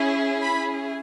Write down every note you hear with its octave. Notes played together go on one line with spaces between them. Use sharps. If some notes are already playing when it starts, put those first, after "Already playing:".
Already playing: C#4 E4 G#4
B5